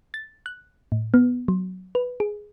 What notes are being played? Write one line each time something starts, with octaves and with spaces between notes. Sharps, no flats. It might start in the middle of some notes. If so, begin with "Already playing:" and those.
A6
F#6
A2
B3
F#3
B4
G#4